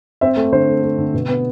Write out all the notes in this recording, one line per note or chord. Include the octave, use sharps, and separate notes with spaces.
C4 E5
A3
D3 C5
A3
A3
D3
B2
B3